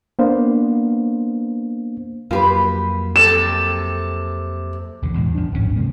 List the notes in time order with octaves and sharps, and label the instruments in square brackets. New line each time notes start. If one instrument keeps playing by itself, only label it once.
[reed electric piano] A#3 B3 D4 C5 F5
[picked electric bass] F2 F#3 A#3 [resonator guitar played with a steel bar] F4 G4 B4
[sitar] C3 A4 [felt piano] E7
[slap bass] B1 E2 D3
E2 A2 G#3
F3 D4
D1 G#1 G2 C#4
C3 F3 G#3 A#3